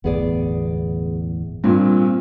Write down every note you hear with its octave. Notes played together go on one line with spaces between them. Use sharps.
G1 E2 A2 B3 G#4 D5
G2 A#2 C4